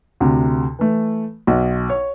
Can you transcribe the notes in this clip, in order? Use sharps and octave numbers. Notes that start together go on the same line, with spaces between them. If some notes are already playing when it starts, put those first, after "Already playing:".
D2 C3
E3 A3
B1
C#5